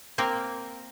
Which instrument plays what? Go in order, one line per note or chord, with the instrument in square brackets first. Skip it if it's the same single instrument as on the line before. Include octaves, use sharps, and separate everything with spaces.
[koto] A#3 C4 A#4